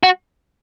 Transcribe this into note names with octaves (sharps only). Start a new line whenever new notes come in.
F#4